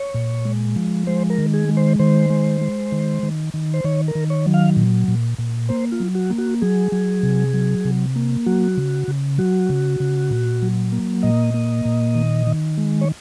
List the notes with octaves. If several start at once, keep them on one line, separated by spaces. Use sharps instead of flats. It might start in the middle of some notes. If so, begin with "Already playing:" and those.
Already playing: C#5
A#2
G#3
F3
G#3 C5
A#4
D#3
G#4
G#3
C5
D#3 C5
G#3
G#3
D#3
D#3
D#3
C5
D#3 C#5
A#4
D#3
C#5
F#3
F5
A#2
A#2
A#2
A#3 C5
F4
F#3
F#4
A#3
F#4
F#3 G#4
F#3
C3
F#3
C3
A#3
F#3 F#4
C#3
C#3
F#3 F#4
C#3
C#3
A#2
F#3
A#3
A#2 D#5
A#3
A#2
D#3
D#3
G#3
C#5